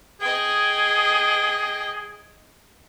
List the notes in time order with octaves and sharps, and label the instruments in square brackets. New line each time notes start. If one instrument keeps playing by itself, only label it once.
[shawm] G#4 [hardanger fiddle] D#5 G5